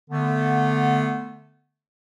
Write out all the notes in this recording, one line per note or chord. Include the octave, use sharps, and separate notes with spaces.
D3 A3 B3